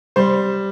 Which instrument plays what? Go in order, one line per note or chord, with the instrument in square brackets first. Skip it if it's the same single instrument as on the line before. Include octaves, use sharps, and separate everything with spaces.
[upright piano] G3 C5